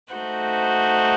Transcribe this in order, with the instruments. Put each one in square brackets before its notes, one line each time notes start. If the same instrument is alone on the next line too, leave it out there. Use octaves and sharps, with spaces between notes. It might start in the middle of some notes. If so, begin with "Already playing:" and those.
[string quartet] A3 D#4 F#4 C5